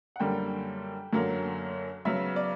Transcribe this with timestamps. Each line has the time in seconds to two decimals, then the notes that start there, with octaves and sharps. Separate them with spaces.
0.16 F#5
0.20 F#2 D3 G3 A#3 G5
1.13 F#2 D3 F#3 A#3
2.05 C#3 F#3 B3 E5
2.36 D5